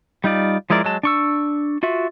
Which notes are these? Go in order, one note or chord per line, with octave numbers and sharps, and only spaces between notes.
G3 D#4 F4 D5
F3 G#3 E4 A#4 D5
F#3 G#3 A5
D4 C#6 E6
F4 F#4 E5